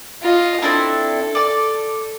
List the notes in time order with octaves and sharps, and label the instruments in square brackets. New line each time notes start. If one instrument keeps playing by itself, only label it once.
[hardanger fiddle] F4 D#5
[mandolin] C4 D4 E4 [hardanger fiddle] A4
[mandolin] D5 D6